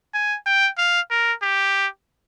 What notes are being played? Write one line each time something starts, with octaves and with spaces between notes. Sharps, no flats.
G#5
G5
F5
A#4
G4